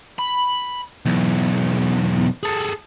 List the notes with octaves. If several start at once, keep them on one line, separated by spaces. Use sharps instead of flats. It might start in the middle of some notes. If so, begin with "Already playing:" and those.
B5
B1 E2
G#4 A4